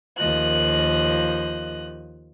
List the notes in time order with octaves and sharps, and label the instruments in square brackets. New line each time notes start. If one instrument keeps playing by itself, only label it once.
[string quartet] D#2 F3 D#5 F#6